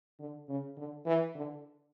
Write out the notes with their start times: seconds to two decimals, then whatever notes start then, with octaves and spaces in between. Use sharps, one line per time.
0.19 D3
0.49 C#3
0.77 D3
1.06 E3
1.35 D3